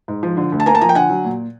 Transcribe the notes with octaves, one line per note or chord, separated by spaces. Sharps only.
G#2
F3
D3
D2
A5
A#3 G#5 A#5
A5
F3 G#5 A#5
G5
D3 F#5 G#5
F#3
A#2